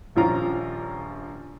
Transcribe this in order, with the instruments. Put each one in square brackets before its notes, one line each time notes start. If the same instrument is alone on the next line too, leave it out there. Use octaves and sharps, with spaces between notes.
[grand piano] D#1 A#1 F3 C#4 F4 A#5